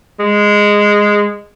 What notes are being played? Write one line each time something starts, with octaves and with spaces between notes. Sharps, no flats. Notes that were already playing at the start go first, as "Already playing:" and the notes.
G#3